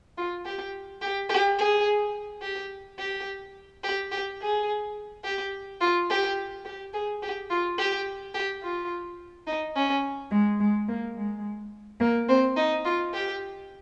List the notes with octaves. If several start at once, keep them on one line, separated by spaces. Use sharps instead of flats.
F4
G4
G4
G4
G#4
G4
G4
G4
G4
G#4
G4
F4
G4
G4
G#4
G4
F4
G4
G4
F4
D#4
C#4
G#3
G#3
A#3
G#3
A#3
C4
D#4
F4
G4